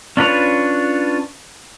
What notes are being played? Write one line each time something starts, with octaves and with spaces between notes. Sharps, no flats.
C#4 D4 F4 B4 C#5